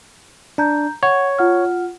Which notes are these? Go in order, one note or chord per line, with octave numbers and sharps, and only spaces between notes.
D4 A#5 G6
C#5 F#5
F4 F#5 F6